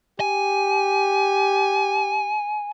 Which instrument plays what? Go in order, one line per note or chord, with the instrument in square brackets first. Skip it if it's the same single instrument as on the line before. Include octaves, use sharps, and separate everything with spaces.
[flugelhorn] G4 [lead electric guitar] G#5